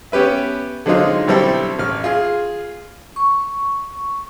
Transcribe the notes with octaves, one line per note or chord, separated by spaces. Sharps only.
B3 C#4 G4 B4 E5
D3 F#3 G#3 C4 D#4 F4
B1 D3 G3 C4 E4 A4
A1 F6
F4 G#4
C#6